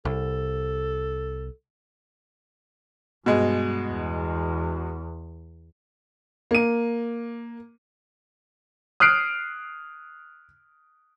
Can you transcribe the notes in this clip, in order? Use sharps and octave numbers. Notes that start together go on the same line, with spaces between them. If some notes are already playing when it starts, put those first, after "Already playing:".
C2 A4
G2 B2 G#3
E2
A#3 D#7
D#6 F6 F#6 C7 D7